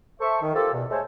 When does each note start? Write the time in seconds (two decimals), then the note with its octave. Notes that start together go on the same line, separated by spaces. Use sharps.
0.19 A4 C5 E5 C#6
0.41 D#3
0.54 A#3 C4 F4 G4 A4
0.73 E2 B2
0.90 G#3 A3 G#4 A4 C5 C#5